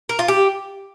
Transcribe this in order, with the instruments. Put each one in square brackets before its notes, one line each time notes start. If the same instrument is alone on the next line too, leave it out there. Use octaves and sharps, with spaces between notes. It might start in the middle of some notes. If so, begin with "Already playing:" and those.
[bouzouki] A#4
F4
G4